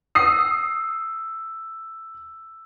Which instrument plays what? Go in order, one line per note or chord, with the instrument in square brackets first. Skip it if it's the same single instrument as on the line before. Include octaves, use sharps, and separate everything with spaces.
[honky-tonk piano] D#6 C7 [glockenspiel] E6